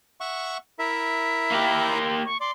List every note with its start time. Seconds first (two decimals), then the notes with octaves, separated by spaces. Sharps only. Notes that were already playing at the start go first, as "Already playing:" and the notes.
0.21 E5 F#5 C#6
0.79 E4 A#4 E5 B6
1.51 A#3 G4
1.88 C6
2.25 C#6
2.40 D5 C6